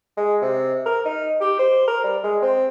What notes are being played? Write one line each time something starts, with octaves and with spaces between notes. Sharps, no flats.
G#3
C3
A#4
D#4
G4
C5
A#4
G3
G#3
C4